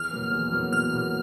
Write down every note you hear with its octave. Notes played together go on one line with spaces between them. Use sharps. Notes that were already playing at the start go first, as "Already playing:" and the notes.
Already playing: E2 F6
B2 F#3 A#3
E2
B2 F#3 A#3
E2 F6
B2 F#3 A#3